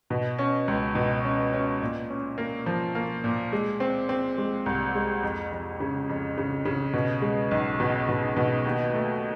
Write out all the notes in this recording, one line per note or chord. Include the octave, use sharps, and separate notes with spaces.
B2
C#4
C#2
B2
C#4
C#4
A#2
C#4
A#3
F3
A#3
A#2
G#3
C4
C4
G#3
C2
G#3
F2
F2
C#3
F2
C#3
C#3
B2
G#3
B1
B2
B2
B2
D#2
A3